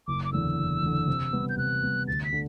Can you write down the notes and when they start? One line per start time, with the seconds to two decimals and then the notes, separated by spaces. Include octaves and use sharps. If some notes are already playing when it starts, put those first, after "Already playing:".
0.07 F#1 D6
0.25 D6
0.33 E2 D3 E6
0.58 F#1
0.82 E2 D3
1.08 C3
1.33 G3 B3
1.49 G6
1.57 C3 F#6
1.83 G3 B3
2.08 D2 A6
2.24 B6
2.33 D3